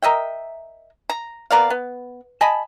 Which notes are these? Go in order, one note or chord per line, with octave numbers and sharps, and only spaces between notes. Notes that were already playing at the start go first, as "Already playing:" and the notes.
A#4 D#5 E5 G5
A#5
B3 A#4 D5 F5
B3
D#5 G#5 A5 B5